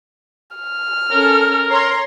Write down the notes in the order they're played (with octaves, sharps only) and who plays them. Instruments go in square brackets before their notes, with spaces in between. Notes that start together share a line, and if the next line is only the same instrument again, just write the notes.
[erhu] F6
[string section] C#4 A4 [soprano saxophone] A#4
[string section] C#5 A#5 C6